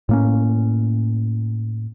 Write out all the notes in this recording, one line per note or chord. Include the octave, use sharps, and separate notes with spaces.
A2 A#3 C#4